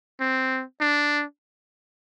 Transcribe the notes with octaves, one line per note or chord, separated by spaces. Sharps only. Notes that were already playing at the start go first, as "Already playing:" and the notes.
C4
D4